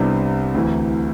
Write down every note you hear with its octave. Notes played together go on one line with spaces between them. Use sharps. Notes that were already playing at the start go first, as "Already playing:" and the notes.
Already playing: C2 C3 G3 B3 D4
D2 C3 E3